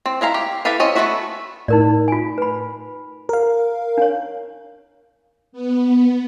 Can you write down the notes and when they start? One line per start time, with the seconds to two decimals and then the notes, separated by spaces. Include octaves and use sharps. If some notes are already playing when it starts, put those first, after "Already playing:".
0.06 C4
0.21 G#3 E4 F5 A#5
0.34 G4
0.65 E4 G4 A4 B4 F5
0.80 C4 C#4 D#5
0.95 A3 B3 E4 F#4 E5
1.68 A2 D#4 A#4 D5
2.08 F4 G#5
2.38 B4 B5
3.29 A#4 F5
3.98 D4 C#5
5.52 B3